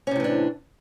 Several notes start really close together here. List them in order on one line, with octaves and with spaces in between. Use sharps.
C#4 C3 A2 E3 D4